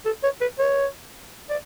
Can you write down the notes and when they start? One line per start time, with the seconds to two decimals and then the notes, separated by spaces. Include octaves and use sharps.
0.05 A4
0.23 C#5
0.41 B4
0.59 C#5
1.50 D5